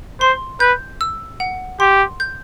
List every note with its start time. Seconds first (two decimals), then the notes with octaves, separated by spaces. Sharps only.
0.21 C5 C6
0.60 B4 G6
1.01 E6
1.40 F#5
1.80 G4 C6
2.20 G6